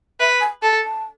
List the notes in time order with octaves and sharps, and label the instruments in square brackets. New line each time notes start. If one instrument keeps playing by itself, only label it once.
[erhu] B4 [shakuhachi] E5
[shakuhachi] G#5
[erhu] A4 [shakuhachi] A5
[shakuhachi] A5